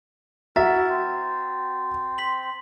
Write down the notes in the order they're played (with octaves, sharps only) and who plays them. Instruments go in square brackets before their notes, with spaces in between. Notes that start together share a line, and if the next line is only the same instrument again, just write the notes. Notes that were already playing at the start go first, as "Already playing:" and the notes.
[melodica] E4 A#4 [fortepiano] F#4 E5 [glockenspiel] A#5 A6
[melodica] C4
[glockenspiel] C6 B6 F#7